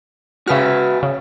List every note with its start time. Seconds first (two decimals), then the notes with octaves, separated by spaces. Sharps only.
0.48 C#3 F#4 B4 E5 F6
1.03 C#3